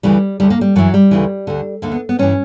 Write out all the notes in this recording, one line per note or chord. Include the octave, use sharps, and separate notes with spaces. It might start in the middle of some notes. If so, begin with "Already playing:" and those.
D2 C#3 E3 G3
D2 D3 G3
A#3
G3
F#2 E3 F#3
G3
D2 C#3 E3
D2 D3
D2 D3 A#3
B3
B3
G2 E3 C#4